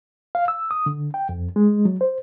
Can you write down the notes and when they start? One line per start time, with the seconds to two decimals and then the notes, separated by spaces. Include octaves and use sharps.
0.35 F5
0.48 E6
0.71 D#6
0.86 D3
1.14 G5
1.29 F2
1.56 G#3
1.85 F#3
2.01 C5